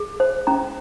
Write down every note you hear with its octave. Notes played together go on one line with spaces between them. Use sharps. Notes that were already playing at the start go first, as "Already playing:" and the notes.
Already playing: G#4
C5
C#4 A#5